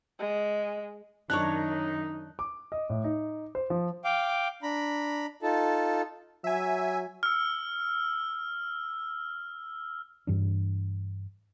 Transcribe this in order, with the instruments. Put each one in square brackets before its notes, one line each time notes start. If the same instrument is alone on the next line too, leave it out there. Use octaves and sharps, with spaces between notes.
[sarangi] G#3
[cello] F#2 D#3 [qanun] D4 A#4 C#5 [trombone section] D#4 [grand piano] C#6 F#6
[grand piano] D6
D#5
A2
D#4
C5
F3
[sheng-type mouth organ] F5 G5 D6
D4 A#5 B5
D#4 F4 A4 A5
[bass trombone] F#3 [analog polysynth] E5 G#5
[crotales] E6 F6
[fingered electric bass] G2 E3 D4